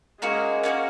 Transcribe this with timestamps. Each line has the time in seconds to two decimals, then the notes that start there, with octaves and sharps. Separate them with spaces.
0.21 G#3 A#3 C#4 F#4 A#4
0.63 A#3 C#4 F#4 A#4